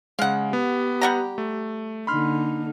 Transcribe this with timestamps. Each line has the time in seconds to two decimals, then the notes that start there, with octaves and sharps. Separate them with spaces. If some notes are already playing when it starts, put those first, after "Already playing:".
0.19 C#3 G#3 F5 F#5
0.53 B3 G4
1.01 G3 F#5 A#5
1.38 A3
2.07 D3 A#3 D#4 B5 C6 F6